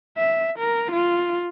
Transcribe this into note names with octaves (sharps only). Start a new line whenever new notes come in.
E5
A#4
F4